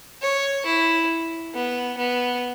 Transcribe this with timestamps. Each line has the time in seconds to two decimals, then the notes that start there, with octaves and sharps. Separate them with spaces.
0.22 C#5
0.66 E4
1.54 B3
1.98 B3